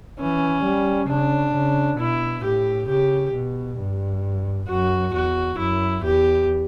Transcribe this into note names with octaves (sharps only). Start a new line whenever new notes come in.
E3 C#4
G3
C#3 D4
C#3
B2 E4
A2 G4
C#3 G4
B2
G2
F#2 F#4
E2 F#4
F#2 E4
E2 G4